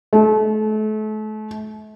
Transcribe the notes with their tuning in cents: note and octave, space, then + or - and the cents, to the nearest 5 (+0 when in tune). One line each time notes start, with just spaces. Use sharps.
A3 -35